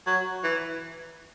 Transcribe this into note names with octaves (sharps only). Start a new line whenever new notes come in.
F#3
E3